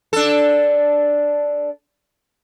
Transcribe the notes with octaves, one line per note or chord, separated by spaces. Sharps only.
D4 A4